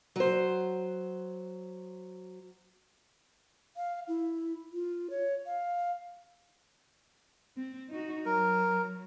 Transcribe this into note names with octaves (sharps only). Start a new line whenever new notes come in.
F#3 C5
F5
E4
F4
C#5
F5
C4
D#4 F#4
F#3 A#4